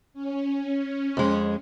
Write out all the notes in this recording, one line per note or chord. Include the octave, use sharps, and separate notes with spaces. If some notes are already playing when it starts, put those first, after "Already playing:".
C#4
F2 G#3